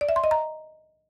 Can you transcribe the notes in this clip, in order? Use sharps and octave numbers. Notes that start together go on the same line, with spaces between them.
D5
E5
C6
D#5
A#5